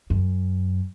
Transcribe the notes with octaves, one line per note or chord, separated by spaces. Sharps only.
F#2